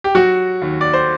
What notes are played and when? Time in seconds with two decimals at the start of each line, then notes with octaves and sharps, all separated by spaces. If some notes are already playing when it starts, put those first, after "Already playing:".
0.04 G4
0.15 F#3 F#4
0.62 D#2
0.81 D5
0.94 C5